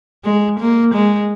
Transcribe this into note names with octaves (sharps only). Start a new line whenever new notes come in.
G#3
A#3
G#3